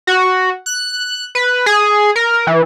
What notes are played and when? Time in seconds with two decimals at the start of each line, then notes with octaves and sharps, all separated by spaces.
0.07 F#4
0.66 F#6
1.35 B4
1.66 G#4
2.16 A#4
2.47 E3